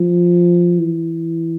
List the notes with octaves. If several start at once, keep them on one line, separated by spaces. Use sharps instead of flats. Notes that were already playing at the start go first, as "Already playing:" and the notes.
Already playing: F3
E3